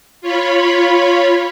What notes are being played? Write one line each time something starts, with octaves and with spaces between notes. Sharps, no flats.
F4 C#5 B5